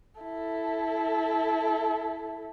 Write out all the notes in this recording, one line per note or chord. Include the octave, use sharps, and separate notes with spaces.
E4 A4